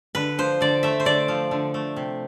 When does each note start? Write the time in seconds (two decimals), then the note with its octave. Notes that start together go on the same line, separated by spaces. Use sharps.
0.15 D3 B4
0.38 F3 C5
0.61 D3 D5
0.83 A3 E5
1.00 C5
1.05 D3 D5
1.28 F3
1.51 D3
1.74 A3
1.96 C3